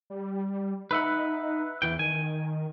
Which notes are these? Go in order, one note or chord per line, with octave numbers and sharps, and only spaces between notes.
G3
D#4 B4 E5 F#5
E2 E3 G5
D#3 G#5